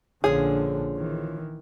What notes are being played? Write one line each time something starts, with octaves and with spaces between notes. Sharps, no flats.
A#1 D3 F3 C#4 G#4
D#3 E3